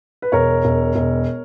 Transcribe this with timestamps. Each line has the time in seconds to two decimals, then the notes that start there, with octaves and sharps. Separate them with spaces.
0.22 B4
0.32 E1 A#4 C#5
0.65 E1
0.96 E1